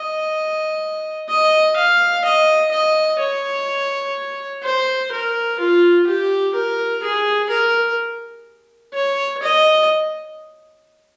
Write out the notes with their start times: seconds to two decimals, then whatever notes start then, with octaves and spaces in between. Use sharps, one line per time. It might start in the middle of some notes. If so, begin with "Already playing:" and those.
Already playing: D#5
1.29 D#5
1.76 F5
2.24 D#5
2.72 D#5
3.19 C#5
4.63 C5
5.11 A#4
5.59 F4
6.07 G4
6.54 A#4
7.03 G#4
7.50 A#4
8.93 C#5
9.42 D#5